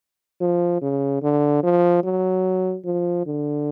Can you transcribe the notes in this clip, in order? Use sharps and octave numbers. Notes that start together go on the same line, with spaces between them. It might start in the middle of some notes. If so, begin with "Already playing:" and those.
F3
C#3
D3
F3
F#3
F3
D3